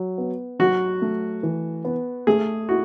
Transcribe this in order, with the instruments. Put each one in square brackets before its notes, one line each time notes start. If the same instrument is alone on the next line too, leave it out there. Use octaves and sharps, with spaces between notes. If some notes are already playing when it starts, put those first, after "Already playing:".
Already playing: [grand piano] F#3
B3
[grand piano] F#3 [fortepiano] F#4
[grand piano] A3
E3
B3
[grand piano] A3 [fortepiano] G#4
[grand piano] E4 [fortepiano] F#4